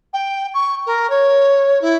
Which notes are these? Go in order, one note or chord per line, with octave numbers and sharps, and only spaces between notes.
G5
C#6
A#4
C#5
E4